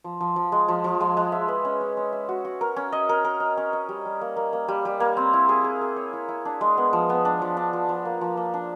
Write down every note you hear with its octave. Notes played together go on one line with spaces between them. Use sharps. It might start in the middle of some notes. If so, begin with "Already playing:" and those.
F3
F3
F3
G#3
F3
F3
G#3
G#3
E5
B4
C#4
C#4
C#4
E5
F#4
F#4
A#4
C#4
D#5
A#4
A#4
D#5
C#4
D#5
G3
G3
A#3
A#3
A#3
G3
G3
A#3
C4
E4
G#4
G#4
G#4
C#5
E4
E4
D4
G#3
B3
F3
B3
D4
F3
D4
F3
F3
A#3
F3
A#3
D4